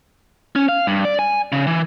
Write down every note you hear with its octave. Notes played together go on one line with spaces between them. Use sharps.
C#4
F5
G2
D5
G#5
C#3
E3